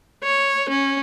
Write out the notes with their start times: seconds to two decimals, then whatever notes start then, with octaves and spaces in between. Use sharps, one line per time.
0.23 C#5
0.69 C#4